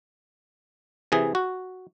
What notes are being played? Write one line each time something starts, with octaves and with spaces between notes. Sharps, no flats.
C3 E3 G#4
F#4